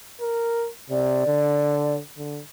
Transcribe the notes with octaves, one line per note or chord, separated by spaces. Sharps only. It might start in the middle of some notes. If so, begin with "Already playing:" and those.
A#4
C3 D5
D3
D3